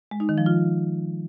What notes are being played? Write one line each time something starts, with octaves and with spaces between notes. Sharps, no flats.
G#3
D#4
D#3
F3
F4